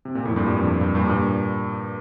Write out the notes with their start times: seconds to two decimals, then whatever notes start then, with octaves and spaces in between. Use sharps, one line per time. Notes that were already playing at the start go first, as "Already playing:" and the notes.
0.05 C3
0.15 A#2
0.25 F2 A2
0.36 G2 A#2
0.47 G2
0.56 F2
0.67 F2
0.81 G2
0.95 G2 A#2
1.09 G2 A#2